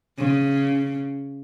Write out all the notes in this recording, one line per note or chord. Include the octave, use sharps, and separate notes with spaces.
C#3